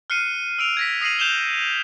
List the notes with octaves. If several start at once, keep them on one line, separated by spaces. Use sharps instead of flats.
F6 F#6 C7 C#7 D#7
E6 D7 F7
G#6 A#6 B6
D#6 A#6 C7 D#7 F#7
G6 E7 F7 G7